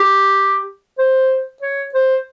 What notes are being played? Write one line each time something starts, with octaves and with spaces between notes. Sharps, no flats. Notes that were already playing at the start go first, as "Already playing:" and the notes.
Already playing: G4
C5
C#5
C5